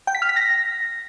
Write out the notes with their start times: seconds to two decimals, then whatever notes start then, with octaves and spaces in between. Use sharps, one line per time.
0.07 G5
0.15 B6
0.22 F6
0.29 B6
0.36 A#6